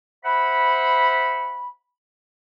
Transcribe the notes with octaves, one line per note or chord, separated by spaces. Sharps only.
C5 E5 F#5 B5